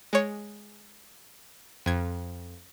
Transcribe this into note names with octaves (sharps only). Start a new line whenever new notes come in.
G#3 C#5
F2 G#6